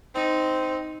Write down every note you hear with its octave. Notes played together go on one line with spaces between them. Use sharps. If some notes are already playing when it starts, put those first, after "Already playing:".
C4 D#4